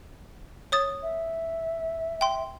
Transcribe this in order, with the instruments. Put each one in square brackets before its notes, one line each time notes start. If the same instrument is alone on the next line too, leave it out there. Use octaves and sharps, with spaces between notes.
[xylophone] C#5 D#6 A6
[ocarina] E5
[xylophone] G5 C6